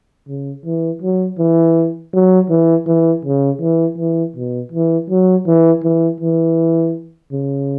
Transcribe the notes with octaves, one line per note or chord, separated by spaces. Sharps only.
C#3
E3
F#3
E3
F#3
E3
E3
C#3
E3
E3
B2
E3
F#3
E3
E3
E3
C#3